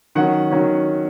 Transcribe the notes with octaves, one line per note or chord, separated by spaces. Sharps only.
D#3 F#3 C#4 F#5
D#3 F#3 C#4